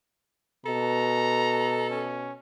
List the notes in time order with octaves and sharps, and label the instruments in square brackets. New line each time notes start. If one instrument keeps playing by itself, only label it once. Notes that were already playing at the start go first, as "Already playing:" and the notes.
[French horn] B2 [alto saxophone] A4 [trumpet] A#5
[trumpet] C#4